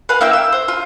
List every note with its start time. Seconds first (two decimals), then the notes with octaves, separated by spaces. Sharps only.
0.09 B4 F5 F#5
0.21 A#3 E4 G5 E6
0.33 E6
0.52 C5
0.68 F4